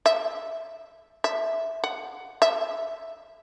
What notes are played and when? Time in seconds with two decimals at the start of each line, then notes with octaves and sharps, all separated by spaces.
0.06 E5
1.24 E5
1.84 F#5
2.42 E5